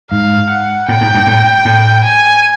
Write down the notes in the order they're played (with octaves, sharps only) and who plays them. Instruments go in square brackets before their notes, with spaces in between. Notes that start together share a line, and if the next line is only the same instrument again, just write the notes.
[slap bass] G#2 [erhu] F5
[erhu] F#5
[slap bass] A2 [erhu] G5
[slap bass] G#2
G2
A2
A2
[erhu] G#5